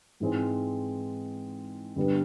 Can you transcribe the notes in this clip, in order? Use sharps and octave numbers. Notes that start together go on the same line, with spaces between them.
G#2 E3 G#3 C4
G2 D3 G3 B3 D4